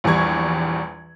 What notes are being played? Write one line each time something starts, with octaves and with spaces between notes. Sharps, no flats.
A#1 E2 G3 C#6 G#6